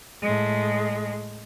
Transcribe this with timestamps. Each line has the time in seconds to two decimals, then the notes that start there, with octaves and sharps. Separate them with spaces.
0.22 A2 G#3